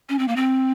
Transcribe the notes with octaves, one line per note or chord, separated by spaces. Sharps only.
C#4
C4
A#3
C4